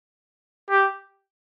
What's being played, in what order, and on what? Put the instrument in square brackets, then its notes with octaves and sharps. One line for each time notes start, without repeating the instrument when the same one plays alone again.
[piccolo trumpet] G4